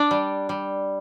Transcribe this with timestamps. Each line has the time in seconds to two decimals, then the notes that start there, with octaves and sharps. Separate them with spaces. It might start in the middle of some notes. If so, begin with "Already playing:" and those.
Already playing: D4 D5
0.11 G3
0.49 G3